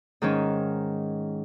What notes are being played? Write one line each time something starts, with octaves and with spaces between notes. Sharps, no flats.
G#2 D#3 G#3 C#4